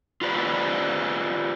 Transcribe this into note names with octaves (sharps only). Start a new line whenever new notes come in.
F4 G4 B4 C5 D5